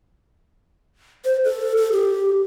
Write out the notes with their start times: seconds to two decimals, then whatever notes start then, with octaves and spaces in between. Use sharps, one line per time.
1.25 C5
1.44 A4
1.77 A4
1.92 G4